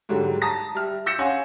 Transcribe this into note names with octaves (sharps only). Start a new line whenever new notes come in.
G#2 D3 F#3 G3
A5 A#5 D#6 A#6
G3 E5 F6
E6 G6 A#6 C#7 E7
C#4 C#5 F5 F#5 G#5 C6